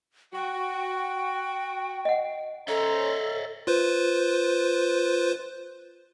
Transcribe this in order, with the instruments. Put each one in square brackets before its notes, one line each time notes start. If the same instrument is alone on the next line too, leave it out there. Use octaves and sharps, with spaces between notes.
[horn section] F#4 [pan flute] G5
[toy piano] D#5 F#5
[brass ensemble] C#4 C5 A#5 [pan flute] A4 [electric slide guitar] C#5 D#5 E5
[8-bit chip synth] F4 B4 C5